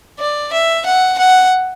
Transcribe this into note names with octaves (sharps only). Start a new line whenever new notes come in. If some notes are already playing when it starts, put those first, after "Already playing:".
D5
E5
F#5
F#5